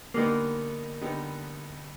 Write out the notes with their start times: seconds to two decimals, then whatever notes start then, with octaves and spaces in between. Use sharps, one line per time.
0.14 D3 G3 A#3 B3 D#4
1.01 D3 G3 B3 D#4